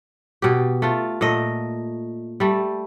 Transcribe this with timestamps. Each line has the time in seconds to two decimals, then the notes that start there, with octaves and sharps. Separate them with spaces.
0.42 B2 G4
0.82 A3 F4
1.21 A#2 A3 D#5
2.40 G3 A3